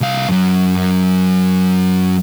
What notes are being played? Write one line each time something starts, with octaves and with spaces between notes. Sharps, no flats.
C2 F5
F#2 F#3